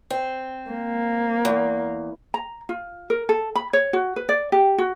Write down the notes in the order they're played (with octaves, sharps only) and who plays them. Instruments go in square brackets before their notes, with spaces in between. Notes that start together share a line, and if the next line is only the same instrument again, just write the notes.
[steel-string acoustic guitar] C4
[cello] A#3
[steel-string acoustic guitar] E2
[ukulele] A#5
F4
A#4
A4
B5
C#5
F#4
B4
D5
G4
F#4